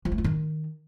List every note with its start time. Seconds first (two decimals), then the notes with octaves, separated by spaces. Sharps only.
0.05 F3
0.12 A3
0.18 F4
0.24 D#3